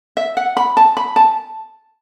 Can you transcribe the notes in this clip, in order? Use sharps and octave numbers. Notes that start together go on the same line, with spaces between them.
E5
F#5
B5
A5
B5
A5